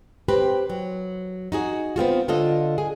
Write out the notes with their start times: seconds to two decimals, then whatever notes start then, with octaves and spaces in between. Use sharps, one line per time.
0.28 C4 G4 B4
0.70 F#3
1.52 D#4 F#4 G#4
1.96 B3 C4 F4 F#4
2.28 D3 F4 A4 D#5
2.78 G#4